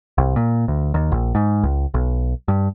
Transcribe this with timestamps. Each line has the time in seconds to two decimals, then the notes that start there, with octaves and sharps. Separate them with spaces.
0.18 C2
0.36 A#2
0.68 D2
0.94 D#2
1.12 A#1
1.35 G#2
1.63 C#2
1.94 B1
2.48 G2